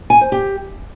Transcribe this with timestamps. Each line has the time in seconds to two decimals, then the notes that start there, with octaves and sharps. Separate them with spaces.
0.10 G#5
0.21 C5
0.32 G4